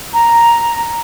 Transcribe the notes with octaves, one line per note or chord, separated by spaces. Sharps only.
A#5